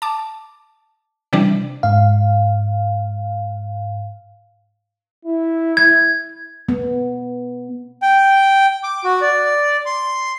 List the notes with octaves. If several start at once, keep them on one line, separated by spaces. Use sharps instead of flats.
A5 D6
C3 E3 G3 D4
G#2 F5
E4
G#6
B3
G5
D6
F#4
D5
C6